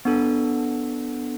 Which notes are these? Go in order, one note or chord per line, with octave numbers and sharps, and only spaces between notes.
B3 D4 A4